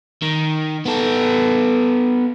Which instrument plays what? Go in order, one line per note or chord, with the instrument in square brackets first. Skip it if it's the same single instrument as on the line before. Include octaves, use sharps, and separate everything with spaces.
[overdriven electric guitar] D#3
B3 A4